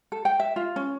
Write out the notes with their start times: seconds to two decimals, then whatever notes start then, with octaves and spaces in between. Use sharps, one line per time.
0.12 A4
0.25 G5
0.40 E5
0.56 F4
0.76 C#4